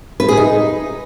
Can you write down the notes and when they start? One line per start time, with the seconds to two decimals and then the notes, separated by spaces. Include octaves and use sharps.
0.20 B4
0.29 G#4
0.37 D#4